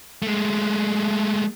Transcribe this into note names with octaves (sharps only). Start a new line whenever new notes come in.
G#3 A3